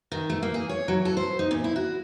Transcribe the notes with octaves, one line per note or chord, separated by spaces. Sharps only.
D#3
A3
A#3
G#4
C#5
F#3
A4
C5
D#4
A#2
E4
F#4